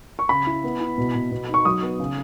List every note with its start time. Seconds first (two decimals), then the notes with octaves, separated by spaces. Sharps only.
0.19 C#6
0.29 C#3 B5
0.47 E4
0.64 B3
0.80 E4
0.98 B2
1.15 B2
1.31 B2
1.49 D#4
1.54 C#6
1.65 F#3 D#6
1.83 B3
1.99 C#3